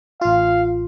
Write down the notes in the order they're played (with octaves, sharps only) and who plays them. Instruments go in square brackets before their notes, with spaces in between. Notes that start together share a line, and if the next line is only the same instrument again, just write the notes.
[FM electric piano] A1 F4 [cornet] F5